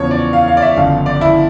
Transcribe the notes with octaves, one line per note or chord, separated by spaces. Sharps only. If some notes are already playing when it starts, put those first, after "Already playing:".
Already playing: E2 C#3 F3 C#5
D5
F5
F5
D5
E5
G1 F2 C#3 F5
D5
E4